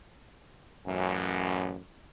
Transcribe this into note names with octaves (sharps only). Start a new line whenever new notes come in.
A1 F#2